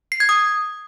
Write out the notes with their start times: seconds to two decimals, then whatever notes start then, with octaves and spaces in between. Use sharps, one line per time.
0.12 C7
0.20 G#6
0.29 D#6